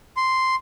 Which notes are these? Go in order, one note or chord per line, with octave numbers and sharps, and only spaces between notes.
C6